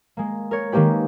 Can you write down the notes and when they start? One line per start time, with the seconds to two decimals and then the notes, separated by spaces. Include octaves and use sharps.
0.17 G#3 A#3
0.51 A#4 C#5
0.72 D#3 G#3 A#3 C#4 G4 B4